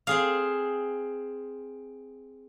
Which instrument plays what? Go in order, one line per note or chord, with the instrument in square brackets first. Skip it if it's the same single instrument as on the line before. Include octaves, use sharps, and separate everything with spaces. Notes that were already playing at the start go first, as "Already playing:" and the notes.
[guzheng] C4 G#4 F5